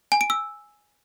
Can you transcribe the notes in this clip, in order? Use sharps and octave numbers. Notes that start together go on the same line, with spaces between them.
G#5
D7
E6